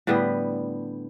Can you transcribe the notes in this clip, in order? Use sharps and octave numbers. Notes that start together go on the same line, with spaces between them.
A2 D3 G3 B3